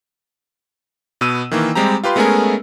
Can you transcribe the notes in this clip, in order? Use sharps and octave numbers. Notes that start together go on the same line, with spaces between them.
B2 B3 E6 D#7
D#3 E3 A#3
G3 G#3 C4 G4 A#5
F4 G4 B4 C6
G#3 A3 B3 C#4 G#4 A#4